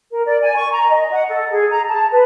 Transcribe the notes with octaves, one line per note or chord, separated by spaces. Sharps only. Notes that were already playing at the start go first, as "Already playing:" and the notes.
A#4
D5
G#5
C#6
A#5
D#5
F#5
A4
G#4
A#5
A5
B4